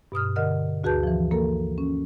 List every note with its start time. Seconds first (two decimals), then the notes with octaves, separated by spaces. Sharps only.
0.12 G2 B2 D#6 F6
0.36 D3 A#4 D#5 F#5 F6
0.84 D2 F#4 G#4 B4 A5 G6
1.03 E3 F3
1.31 A#3 A4 A#4
1.78 C#4